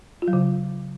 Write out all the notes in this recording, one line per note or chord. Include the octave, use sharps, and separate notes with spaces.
F4
F#3
C#3